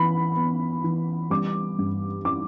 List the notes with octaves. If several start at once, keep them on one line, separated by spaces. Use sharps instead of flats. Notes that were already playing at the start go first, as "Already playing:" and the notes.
Already playing: E3 B3 B5
B3
E3
G3 D6
G2
E4 D6